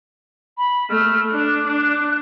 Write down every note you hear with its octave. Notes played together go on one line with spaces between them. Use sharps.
B5
A3 F6
D4 F#6
D4